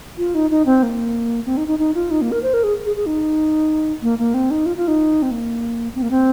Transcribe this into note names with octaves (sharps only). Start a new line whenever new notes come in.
F4
D#4
D#4
C4
A#3
C4
D#4
D#4
D#4
F4
D#4
A#3
A#4
C5
A#4
G#4
G#4
G#4
D#4
A#3
A#3
C4
D#4
F4
F4
D#4
C4
A#3
C4
A#3
C4